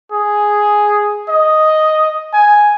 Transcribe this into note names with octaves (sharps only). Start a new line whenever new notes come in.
G#4
D#5
G#5